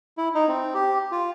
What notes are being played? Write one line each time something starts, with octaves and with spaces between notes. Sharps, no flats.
E4
D#4
C4
G4
F4